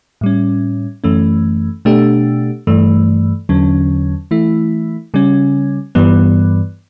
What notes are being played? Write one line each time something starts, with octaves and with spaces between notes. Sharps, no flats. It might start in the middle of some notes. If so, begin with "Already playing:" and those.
A2 G3 C#4
F#2 E3 A3 C#4
B2 A3 D4 G4
G2 E3 A3
E2 D3 F#3 C#4
E3 A3 E4
C#3 G3 C#4
G2 E3 G3 B3